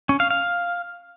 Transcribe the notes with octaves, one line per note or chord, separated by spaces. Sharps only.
C#4
F5
F5